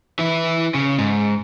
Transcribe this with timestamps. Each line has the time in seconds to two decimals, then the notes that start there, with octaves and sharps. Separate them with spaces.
0.19 E3 E4
0.74 C#3
0.99 G#2